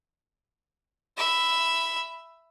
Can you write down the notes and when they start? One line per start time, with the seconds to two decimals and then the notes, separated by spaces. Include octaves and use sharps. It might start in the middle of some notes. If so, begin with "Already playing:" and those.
1.17 E5 B5